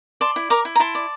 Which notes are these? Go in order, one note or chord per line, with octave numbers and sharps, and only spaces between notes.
D5 A5 C6
E4
A#4 A#5 D6
E4
A#5
E4 A5 C6
D5